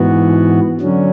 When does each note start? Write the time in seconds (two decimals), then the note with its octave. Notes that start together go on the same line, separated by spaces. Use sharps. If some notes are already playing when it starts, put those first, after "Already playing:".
Already playing: G#2 E3 B3 F#4
0.80 D3 F#3 C#4